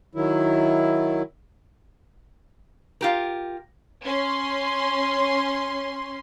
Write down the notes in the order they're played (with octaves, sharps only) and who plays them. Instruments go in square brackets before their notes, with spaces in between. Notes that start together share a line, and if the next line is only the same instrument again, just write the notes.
[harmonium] D#3 F#3 E4
[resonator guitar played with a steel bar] F4 G4 A#4
[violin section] C#4 C6